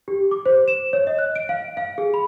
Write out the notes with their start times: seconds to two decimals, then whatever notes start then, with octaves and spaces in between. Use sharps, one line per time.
0.08 G4
0.31 D6
0.46 C5
0.68 E7
0.93 C#5
1.07 D#5
1.18 F#6
1.36 D7
1.49 F5
1.77 F5
1.98 G#4
2.14 B5